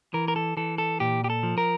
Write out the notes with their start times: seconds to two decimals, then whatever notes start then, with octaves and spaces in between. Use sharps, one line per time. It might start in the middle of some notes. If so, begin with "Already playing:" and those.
0.14 E3 A#4
0.28 A#4
0.36 A4
0.57 E3 A4
0.78 A4
1.00 A#2 G4
1.24 G4
1.30 A4
1.43 F3
1.58 A#4